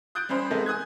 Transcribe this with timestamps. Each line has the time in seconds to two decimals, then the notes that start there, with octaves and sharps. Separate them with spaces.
0.15 D#6 F#6 G6 A6 D7
0.29 C2 C#4 C5 B5 G6
0.50 C3 G#3 A#3 B3 D#4 A4
0.66 G#5 D#6 F#6 G#6